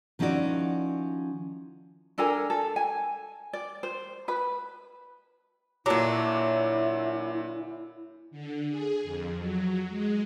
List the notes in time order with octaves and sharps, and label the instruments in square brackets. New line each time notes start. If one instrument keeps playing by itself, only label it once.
[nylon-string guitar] D#3 F3 C#4 E4 F#4 D5
[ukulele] D4 A4 A#4 G#5
A4
G#5
D5
C5
B4 B5
[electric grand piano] A#2 A5 D6 [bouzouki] D3 F#3 [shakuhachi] E4
[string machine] D3
G#4
F2
F#3
G#3